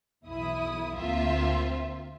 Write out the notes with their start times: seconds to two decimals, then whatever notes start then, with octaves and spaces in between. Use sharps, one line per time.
0.25 B1 E2 E4 D#6
0.96 D2 A#3 C4 F4 E5